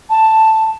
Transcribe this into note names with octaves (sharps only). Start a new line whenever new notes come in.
A5